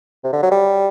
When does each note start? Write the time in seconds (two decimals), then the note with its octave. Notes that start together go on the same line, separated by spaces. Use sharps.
0.24 C3
0.33 D3
0.43 F#3
0.51 G3